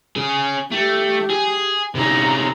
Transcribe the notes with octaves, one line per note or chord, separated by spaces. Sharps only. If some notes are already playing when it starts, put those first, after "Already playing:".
C#4 G#4
A3 G4
G#4
C3 C#4 D#4 A#5